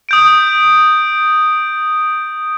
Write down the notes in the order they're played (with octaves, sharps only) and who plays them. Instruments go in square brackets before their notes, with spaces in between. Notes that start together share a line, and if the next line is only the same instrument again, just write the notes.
[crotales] D#6 G6 D7